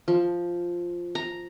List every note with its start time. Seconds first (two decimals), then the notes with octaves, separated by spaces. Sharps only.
0.08 F3
1.15 A#5